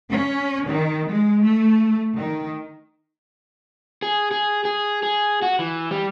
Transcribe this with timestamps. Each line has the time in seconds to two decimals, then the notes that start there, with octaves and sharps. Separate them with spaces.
0.12 C#4
0.67 D#3
1.09 G#3
1.44 A3
2.17 D#3
4.02 G#4
4.31 G#4
4.65 G#4
5.03 G#4
5.42 F#4
5.59 E3
5.91 G3